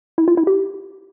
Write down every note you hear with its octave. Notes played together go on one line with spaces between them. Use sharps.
E4
F4
E4
G4